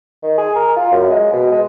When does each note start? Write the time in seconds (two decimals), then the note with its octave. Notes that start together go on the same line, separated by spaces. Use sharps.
0.23 D#3
0.37 G#4
0.55 A#4
0.76 F4
0.91 F#2
1.09 G#3
1.33 B2
1.51 G#3